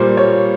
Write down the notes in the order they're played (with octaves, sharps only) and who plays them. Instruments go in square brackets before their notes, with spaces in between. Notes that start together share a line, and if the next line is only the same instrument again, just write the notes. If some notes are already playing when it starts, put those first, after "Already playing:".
Already playing: [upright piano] A#2 G3 A#3 C5
C#5